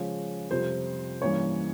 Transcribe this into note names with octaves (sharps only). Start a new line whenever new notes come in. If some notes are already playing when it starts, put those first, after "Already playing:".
Already playing: C#3 F3 G#3 C#4
F2 C3 G3 C5
G2 E3 A#3 C#4 C#5